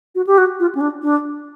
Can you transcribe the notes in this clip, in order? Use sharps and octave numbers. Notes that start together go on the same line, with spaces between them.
F#4
G4
F#4
F4
C#4
D4
D4